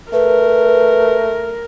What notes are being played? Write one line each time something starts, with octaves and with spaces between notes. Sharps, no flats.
A3 A#4 B4